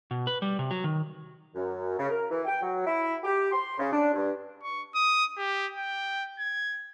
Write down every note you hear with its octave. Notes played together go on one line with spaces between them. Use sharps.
B2
B4
G3
C3
F#3
D#3
F#2
C#3
A#4
E3
G5
F#3
E4
G4
C6
C#3
D4
G2
C#6
D#6
G4
G5
G#6